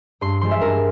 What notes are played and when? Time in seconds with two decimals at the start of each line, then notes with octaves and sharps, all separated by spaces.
0.21 G2 C6
0.41 F3 G#3 C6
0.51 E5
0.61 G2 A#4